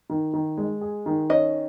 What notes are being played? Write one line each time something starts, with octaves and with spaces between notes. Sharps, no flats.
D#3
D#3
G#3
G#4
D#3
C#4 D#5